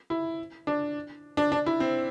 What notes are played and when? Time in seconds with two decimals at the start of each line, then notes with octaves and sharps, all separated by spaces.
0.10 E4
0.67 D4
1.37 D4
1.52 D4
1.66 E4
1.80 C4